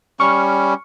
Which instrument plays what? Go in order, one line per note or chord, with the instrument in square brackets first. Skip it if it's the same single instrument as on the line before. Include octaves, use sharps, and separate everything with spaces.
[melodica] G3 C#4 [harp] C#6 F6